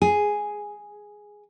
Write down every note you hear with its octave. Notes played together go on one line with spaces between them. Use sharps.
G#4